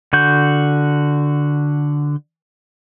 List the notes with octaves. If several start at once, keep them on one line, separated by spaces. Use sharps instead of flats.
D3 F#4 G6